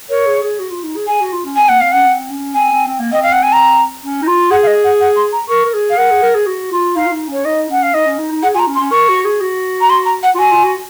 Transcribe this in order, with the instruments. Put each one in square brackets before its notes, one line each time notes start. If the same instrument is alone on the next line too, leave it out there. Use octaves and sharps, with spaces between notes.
[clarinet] A#4 [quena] C#5
[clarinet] G#4
G#4
F#4
F4
D#4
G#4
[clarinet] G#4 [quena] G#5
[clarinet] F#4
F4
C#4
[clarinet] C4 [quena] G#5
[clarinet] A#3 [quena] F#5
[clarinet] C4 [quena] F5
[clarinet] C#4 [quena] F#5
[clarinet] C4
C#4
[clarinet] C4 [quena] G#5
[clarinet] C4
C4
A#3
[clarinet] C4 [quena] D#5
[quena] F5
F#5
G#5
A#5
[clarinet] C#4
D#4
F4
[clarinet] G#4 [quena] F#5
[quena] F5
D#5
F#5
F#5
C6
A#5
[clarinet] A#4 [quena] C#6
[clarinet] A#4
G#4
[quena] F5
[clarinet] A#4 [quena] F#5
[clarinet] G#4
A#4
G#4
F#4
F4
[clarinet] D#4 [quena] F5
[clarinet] F4
D#4
[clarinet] C#4 [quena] C#5
[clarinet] D#4 [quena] D#5
[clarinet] C#4 [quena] F#5
[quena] F5
[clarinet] D#4 [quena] D#5
[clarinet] C#4
D#4
D#4
[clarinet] G#4 [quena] F#5
[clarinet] F4 [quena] G#5 A#5
[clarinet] C#4
[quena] C6
[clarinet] C#4
[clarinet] A#4 [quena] C#6
[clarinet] F#4
G#4
F#4
[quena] A#5
C6
A#5
F#5
[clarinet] F4
[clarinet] F#4 [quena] G#5
[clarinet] F4
F#4